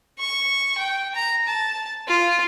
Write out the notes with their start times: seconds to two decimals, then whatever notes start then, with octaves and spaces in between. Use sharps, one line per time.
0.19 C#6
0.78 G5
1.15 A#5
1.47 A5
2.08 F4